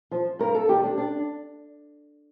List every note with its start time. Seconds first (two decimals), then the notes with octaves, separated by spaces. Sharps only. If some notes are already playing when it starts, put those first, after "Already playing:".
0.11 F3
0.39 G2 A#4
0.54 A4
0.69 D#3 G3 G4
0.83 D4
0.98 D4